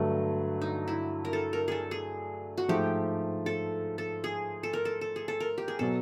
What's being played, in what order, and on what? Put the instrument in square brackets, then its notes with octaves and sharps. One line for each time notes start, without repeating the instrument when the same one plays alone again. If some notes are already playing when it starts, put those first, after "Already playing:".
Already playing: [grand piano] G2 D3 F#3 A3
[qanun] D#4
E4
A#4
A4
A#4
G#4 A4
G#4
F#4
[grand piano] G#2 F3 A3 [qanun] G4
[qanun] A4
A4
G#4
A4
A#4
A4
A4
G#4
A4
A#4
G4
G#4
[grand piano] B2 F#3 [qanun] A4